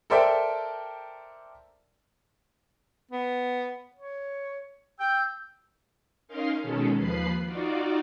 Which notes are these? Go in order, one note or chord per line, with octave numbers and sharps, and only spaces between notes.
A4 A#4 C5 D5 E5 G5
B3
C#5
G5 E6 G6
C#4 D#4 A#4 F5 C6
B2 D#3 G#3 C#4 A4
D#2 F3 B4 B5 C7
D#4 F4 F#4 D5